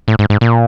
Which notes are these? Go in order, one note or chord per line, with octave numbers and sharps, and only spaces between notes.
A2
G#2
G#2
A#2